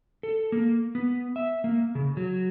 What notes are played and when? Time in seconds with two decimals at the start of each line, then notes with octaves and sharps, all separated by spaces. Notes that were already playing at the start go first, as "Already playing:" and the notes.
0.23 A4
0.52 A#3
0.95 B3
1.36 E5
1.64 A#3
1.95 C#3
2.17 F#3